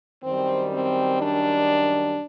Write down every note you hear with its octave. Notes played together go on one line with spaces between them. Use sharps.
F#2 D#3 G3 C4
C4
D4